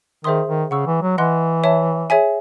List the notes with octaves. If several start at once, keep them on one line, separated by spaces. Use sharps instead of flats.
D#3 G#4 C5 E5 C6 D#6
D#3
C#3 F#5 C#6 E6
E3
F#3
E3 D#5 F#5 C6 F#6
C#5 E5 A5
G#4 C#5 E5 G#5